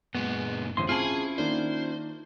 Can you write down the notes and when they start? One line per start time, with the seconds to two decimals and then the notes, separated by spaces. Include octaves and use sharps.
0.15 F#2 A#2 G#3 B3
0.77 A1 D#2 D3 C5 C6
0.89 C4 C#4 E4 F4 G#4 A5 F#7
1.38 D#3 A#3 D4 C5